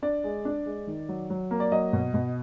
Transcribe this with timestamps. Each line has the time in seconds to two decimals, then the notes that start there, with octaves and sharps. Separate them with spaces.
0.02 D4 D5
0.24 G#3
0.45 D4
0.66 G#3
0.87 D#3
1.09 F#3
1.30 F#3
1.51 A#3
1.60 D5
1.72 F#3 D#5
1.93 B2
2.14 B2